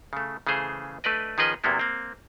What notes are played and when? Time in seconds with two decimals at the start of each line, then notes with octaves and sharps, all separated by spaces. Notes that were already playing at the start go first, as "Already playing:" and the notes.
0.13 C#3 A3
0.47 C#3 E3 A3 G#4 C5
1.04 A3 D4 B4 D5 D#5
1.38 D#3 F3 C#4 G#4 B4 D#5
1.64 E2 C3 F#3 A#3 B3 E4
1.79 A#3 C4